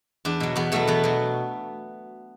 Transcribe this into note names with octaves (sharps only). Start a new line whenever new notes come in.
E2 D4
B2 F#3
E2 B3
B2 F#3 A3
E2 B3
B2 F#3